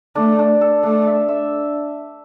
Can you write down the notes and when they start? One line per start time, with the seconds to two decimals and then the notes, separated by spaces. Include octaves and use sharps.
0.15 A3 D4
0.39 D4
0.61 A4
0.83 A3 D4
1.07 E5
1.28 E5